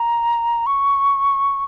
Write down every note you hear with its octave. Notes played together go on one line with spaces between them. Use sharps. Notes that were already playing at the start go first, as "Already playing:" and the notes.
Already playing: A#5
C#6